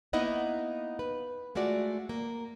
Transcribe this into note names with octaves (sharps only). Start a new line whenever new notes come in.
A#3 B3 D#4 E4 D#5 F#5
B4
G#3 A3 F4 F#4 D5
A#3